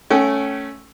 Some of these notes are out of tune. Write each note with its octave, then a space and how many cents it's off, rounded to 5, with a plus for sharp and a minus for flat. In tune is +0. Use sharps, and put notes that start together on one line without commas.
A3 +0 C#4 +0 G5 -40